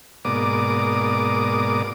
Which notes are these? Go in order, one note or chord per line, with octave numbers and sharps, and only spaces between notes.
G#2 B2 A#3 D5 D6 D#6